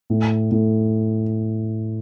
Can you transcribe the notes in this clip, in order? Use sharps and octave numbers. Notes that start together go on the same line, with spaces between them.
A2
A2